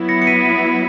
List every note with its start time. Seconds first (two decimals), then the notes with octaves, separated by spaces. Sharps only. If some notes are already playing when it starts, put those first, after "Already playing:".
Already playing: F#3 B3 E4
0.09 A#6 C#7
0.22 C#7
0.27 B6 D#7
0.45 B6 D#7